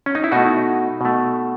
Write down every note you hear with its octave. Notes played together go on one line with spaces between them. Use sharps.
C#4
D#4
E4
B2 A3 D#4 F#4
B2 A3